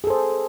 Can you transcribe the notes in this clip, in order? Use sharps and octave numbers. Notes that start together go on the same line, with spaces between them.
G#4 A4 C5